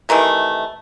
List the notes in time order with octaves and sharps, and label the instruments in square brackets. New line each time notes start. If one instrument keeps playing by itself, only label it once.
[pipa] C3 D#3 E3 A3